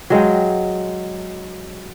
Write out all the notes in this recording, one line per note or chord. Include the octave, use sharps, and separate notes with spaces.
F#3 G#3 F5 G5